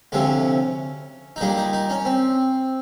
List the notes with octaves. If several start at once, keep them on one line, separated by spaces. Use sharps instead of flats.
D2 C3 F3 A3 C#4
D#4
A#2 G3 A#3 D4
D#4
D#4
C#4
C4